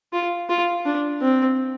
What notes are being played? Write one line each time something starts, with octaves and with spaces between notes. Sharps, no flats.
F4
F4
D4
C4